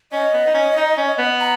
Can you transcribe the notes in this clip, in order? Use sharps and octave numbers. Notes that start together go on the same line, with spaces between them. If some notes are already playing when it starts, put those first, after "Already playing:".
C#4 D#5
B3
D#4
C#4
D#4
C#4
B3
A#5